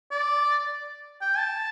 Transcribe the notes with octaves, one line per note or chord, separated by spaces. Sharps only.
D5
G5
A5